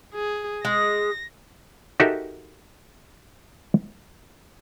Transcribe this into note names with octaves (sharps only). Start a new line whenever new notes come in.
G#4
G#3 A#6
D#4 F#4 G4 A4 A#4 E5